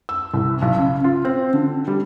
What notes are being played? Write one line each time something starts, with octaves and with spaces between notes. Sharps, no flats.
E6
C2
B1
C#3
F4
C4
D3
G3